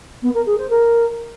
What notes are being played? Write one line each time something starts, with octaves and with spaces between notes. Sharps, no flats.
B3
A#4
G#4
C5
A#4